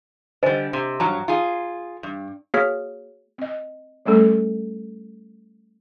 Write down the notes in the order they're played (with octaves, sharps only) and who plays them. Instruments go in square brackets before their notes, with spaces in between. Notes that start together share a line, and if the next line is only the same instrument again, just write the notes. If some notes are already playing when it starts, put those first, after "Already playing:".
[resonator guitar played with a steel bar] D3 G3 [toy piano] C5 D#5 G#5
[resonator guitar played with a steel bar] C3
[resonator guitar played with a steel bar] G2 F#3 [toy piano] A5 A#5
[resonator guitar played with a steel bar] F4 G#4
G2
[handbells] A#3 F#4 G#4 C#5 F6 B6
[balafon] C4 D#5
G3 A3 C#4 A4